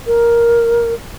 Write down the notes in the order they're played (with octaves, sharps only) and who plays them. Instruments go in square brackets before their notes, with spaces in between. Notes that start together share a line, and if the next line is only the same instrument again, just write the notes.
[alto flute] A#4